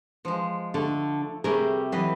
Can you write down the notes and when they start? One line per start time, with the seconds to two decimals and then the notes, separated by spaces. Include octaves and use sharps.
0.25 F3 G#3
0.74 D3 A3 A4
1.44 C3 G3 A3 G#4 A#4
1.92 E3 F#3 B4 D#5